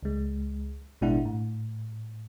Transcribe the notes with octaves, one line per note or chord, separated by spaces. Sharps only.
C#2 G#3
A1 B2 G#3 D4 E4 F#5
A2